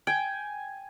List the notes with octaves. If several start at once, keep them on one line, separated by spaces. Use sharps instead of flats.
G5 G#5